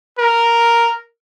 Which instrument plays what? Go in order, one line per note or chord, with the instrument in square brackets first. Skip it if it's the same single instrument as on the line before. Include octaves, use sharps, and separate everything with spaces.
[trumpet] A#4